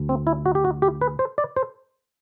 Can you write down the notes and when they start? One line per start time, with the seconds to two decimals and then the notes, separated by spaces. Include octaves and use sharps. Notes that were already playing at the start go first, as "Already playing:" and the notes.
Already playing: D2
0.09 C4
0.27 E4
0.46 F#4
0.55 G4
0.65 F#4
0.82 G4
1.01 B4
1.19 C5
1.38 D5
1.56 C5